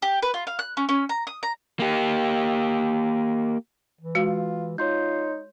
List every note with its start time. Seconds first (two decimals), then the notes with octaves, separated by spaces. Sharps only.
0.02 G4
0.22 B4
0.34 F4
0.47 F5
0.59 F#6
0.77 C#4
0.89 C#4
1.09 A#5
1.27 D#6
1.43 A#5
1.79 A#3 G4
4.01 E3
4.15 G#3 F4 F#4
4.78 D#4 F4 C#5 C6 G6